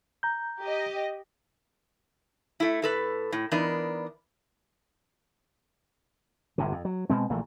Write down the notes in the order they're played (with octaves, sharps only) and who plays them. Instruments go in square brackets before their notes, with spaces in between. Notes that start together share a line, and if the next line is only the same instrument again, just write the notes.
[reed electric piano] A#5 G6
[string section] G4 D#5
[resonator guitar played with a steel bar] A3 E4
A2 A4 B4
A2
E3 B3 D4 D#4 A#4
[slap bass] G1 A2 C3
F2
F#3
B2 G#3 C4
A#1 A#2 E3 A3